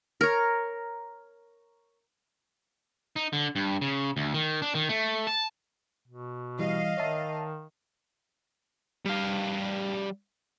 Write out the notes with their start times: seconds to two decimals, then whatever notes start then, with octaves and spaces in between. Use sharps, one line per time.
0.21 A#4 C#5
3.16 D#4
3.33 D3
3.56 G2
3.82 C#3
4.17 D2
4.34 D#3
4.62 D4
4.75 D#3
4.89 A3
5.27 A5
6.08 B2
6.59 E3 G3 D#5 F5
6.97 D#3 C#5 E5 A5
9.06 G3 F5